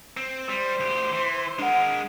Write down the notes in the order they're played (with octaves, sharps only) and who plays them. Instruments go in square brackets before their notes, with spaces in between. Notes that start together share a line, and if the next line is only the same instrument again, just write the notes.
[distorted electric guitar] C4
[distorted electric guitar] G3 [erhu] C5
[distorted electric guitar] D2 G4
E3
[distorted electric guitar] G#3 A#4 [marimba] D4 F#5